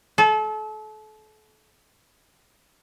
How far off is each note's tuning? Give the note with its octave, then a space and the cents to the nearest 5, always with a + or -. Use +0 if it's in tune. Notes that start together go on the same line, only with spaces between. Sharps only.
A4 -35